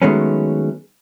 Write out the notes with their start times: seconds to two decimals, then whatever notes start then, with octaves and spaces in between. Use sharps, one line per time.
0.02 D#3 F#3 G#3 A3 B3 C#4